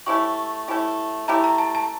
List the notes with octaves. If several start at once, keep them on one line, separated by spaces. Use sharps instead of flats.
A3 C#4 E4 G4 C#6
A3 C#4 E4 G4
A3 C#4 E4 G4 A#5
A#5
A5
A5